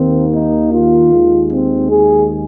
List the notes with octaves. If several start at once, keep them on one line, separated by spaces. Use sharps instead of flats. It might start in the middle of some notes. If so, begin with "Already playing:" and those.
Already playing: D#2 D#3 A#3 C4
D#4
F4
D#2 D#3 G#3
C4
G#4